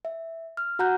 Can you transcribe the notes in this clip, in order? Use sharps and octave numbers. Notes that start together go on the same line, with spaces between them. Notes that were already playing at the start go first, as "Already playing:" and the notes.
E5
F6
F#4 F#5 A#5 F#6 G6